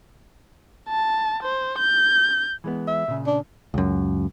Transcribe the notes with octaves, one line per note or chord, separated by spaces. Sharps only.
A5
C5
G6
E3 G#3 B3
E5
A#2 C#3
D4
C#2 F#2